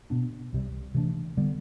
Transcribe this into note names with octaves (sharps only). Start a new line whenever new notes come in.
B2 B3 D4
C2 C3 G3
C3 E3 A3 D4
D3 G3 B3